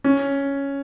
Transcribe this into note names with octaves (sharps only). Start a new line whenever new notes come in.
C#4